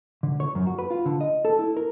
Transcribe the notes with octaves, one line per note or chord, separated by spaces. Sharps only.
D3
C#5
F#2
F#4
B4
F4
D3
D#5
A4
E4
A#4